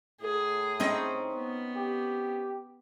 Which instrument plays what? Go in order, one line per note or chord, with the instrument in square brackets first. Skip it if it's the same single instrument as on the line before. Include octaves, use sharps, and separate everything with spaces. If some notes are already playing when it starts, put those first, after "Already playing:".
[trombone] A2 [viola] G#4
[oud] C4 C#4 D#4
[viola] B3
[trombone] G4